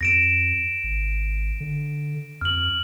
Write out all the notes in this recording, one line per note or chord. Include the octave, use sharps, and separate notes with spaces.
F2 A#6 D7 E7
G#1
D3
F2 F6 F#7